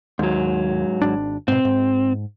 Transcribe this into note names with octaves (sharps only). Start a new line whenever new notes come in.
D#2 G#2 F#3
G#1 D4
G#2 B2 C4
G#2